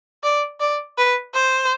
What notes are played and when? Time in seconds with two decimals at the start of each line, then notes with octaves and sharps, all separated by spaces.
0.24 D5
0.60 D5
0.98 B4
1.35 C5